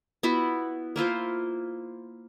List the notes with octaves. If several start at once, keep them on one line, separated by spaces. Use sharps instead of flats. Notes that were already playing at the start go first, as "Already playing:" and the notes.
B3 E4 F#4
A#3 E4 F4 C5